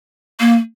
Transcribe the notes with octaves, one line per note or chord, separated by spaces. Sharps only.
A#3